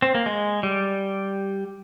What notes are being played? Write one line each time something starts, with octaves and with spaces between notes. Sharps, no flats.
C4
A#3
G#3
G3